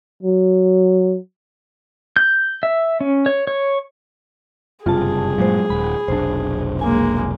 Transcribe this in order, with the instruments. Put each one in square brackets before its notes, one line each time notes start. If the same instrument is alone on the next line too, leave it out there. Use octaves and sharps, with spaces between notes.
[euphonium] F#3
[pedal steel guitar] G6
E5
C#4
C#5
C#5
[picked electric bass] F#1 G2 C3 [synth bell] F4 A5 [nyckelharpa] G#4
[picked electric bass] G2 A#2 [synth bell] F#3 G#3 C5
[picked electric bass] D#1 [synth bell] B5
[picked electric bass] F1 B1 D4 [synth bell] C5
[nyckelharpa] G#3 A#3 [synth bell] G#5